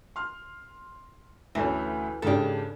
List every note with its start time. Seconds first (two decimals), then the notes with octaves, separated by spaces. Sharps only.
0.16 C6 F6
1.55 D2 E3 A3 C#4
2.22 G#2 C#3 D4 G4 A4